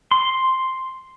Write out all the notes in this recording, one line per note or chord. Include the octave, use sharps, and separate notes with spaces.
C6